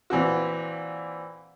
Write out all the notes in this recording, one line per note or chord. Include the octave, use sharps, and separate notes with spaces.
A#2 E3 C4 F#4